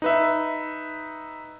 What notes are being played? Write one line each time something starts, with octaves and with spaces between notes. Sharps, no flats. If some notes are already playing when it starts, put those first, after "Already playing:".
D#4 B4 E5